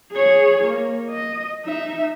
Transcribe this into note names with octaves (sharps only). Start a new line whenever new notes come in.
G#4 C#5
A#3
D#5
D#4 E5